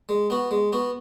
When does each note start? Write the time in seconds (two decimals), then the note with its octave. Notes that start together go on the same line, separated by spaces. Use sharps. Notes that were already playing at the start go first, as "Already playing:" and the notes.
0.09 G#3
0.30 B3 F#4
0.51 G#3
0.73 B3 F#4